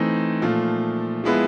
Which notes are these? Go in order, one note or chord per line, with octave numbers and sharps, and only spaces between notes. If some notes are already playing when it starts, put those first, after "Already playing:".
Already playing: E3 A3 C4 D#4
A#2 F3 A3
F3 G#3 B3 E4